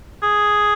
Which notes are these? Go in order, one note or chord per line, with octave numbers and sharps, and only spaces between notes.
G#4